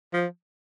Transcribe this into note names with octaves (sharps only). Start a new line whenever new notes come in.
F3